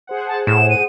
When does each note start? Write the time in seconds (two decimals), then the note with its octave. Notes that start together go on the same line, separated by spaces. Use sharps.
0.07 G#4 C5 F#5
0.28 A5
0.47 A2 E7
0.70 D#7